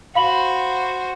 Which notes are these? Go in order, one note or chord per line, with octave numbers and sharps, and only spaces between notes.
F#4 C5 F5 B5 F#7